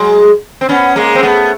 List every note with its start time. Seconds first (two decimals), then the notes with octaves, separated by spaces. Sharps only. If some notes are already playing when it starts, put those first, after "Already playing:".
Already playing: F#3 G#3
0.61 C4
0.69 B3 C#4
0.96 G#3 A#3
1.15 C4
1.23 A3 B3